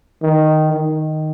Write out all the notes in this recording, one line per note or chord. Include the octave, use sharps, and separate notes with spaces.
D#3
D#3